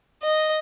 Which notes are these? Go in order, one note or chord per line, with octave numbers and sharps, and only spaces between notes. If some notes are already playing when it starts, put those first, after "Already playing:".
D#5